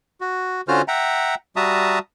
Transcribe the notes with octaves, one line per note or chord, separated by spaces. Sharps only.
F#4
D3 C#4 F4 F#4 C5 F6
E5 F#5 G5 A#5
G3 F#4 E5 A5 A#5 D#6